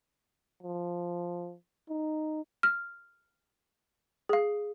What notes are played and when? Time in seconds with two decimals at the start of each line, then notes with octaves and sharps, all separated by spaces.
0.63 F3
1.89 D#4
2.63 F6
4.29 G#4 F5